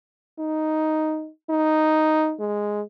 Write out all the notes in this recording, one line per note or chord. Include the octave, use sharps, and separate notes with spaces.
D#4
D#4
G#3